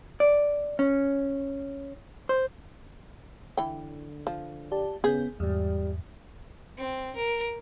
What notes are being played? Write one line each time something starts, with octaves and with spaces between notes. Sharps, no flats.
D5
C#4
C5
D3 E3 G5
F3
G4 D5 A5
C#3 B3 G#4 G6
E2 G#2 G3
C4
A#4